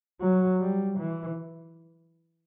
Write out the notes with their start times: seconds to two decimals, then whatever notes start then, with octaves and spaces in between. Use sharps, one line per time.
0.21 F#3
0.60 G3
0.99 E3